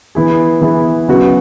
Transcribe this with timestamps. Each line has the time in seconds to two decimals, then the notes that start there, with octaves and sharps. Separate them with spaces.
0.15 E3 B3 E4 G#4
0.61 E3 B3 E4 G#4
1.08 C#3 F#3 B3 F#4